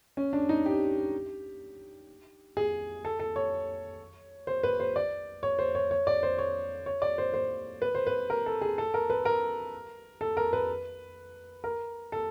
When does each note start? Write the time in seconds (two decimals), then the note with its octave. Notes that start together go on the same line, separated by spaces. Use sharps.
0.17 C#4
0.33 D4
0.49 D#4
0.66 G4
2.57 G#4
3.05 A4
3.19 A4
3.36 C#5
4.47 C5
4.63 B4
4.80 C5
4.96 D5
5.43 C#5
5.59 C5
5.75 C#5
5.91 C#5
6.07 D5
6.23 C5
6.38 C#5
6.86 C#5
7.02 D5
7.18 C5
7.34 C5
7.82 B4
7.95 C5
8.07 B4
8.30 A#4
8.46 A4
8.61 G#4
8.78 A4
8.94 A#4
9.10 B4
9.25 A#4
10.21 A4
10.37 A#4
10.53 B4
11.64 A#4
12.12 A4